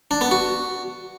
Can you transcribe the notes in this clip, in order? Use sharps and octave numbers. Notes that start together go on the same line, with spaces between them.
D4
B3
F#4